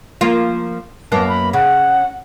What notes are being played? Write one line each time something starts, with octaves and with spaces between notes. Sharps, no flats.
F3 A#3 F4
F#2 A#3 B3 A5
B5
C#3 F#5